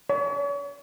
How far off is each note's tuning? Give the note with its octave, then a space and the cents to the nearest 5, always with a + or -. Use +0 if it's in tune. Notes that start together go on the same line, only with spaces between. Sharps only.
C#5 +40